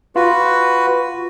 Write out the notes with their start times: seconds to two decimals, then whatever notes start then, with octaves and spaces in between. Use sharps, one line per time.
0.16 F4 F#4 B4